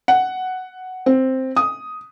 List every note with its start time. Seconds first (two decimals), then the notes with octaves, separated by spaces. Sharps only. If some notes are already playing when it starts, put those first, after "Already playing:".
0.08 F#5
1.06 C4
1.57 D#6